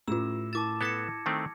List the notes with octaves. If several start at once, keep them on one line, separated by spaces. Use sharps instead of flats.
A2 C#4 F4 E6 E7
E4 A5 D6 A6 E7
B3 A4 A5 G#6 A#6 C#7
D#3 A3 C4